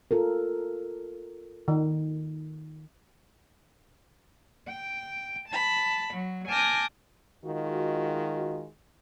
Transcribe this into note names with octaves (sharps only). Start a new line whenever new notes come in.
F4 A4 A#4
D#3
G5
A5 B5
F#3
G#5 A5 D6 F6 G6 A#6
D#3 G#3 F4 F#4